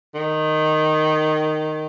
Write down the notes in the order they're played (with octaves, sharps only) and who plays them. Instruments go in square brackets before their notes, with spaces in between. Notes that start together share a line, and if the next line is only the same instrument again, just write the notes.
[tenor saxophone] D#3